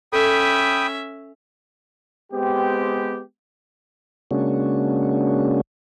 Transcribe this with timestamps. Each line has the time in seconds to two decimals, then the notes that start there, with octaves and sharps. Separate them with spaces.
0.13 C#4 A4 E5 G5 B5 D#6
2.32 G#3 B3 C4 G4
4.31 C#3 G#3 A#3 C#4 D4 F#4